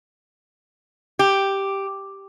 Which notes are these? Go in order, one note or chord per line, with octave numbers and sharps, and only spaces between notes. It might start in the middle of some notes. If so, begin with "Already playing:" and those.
G4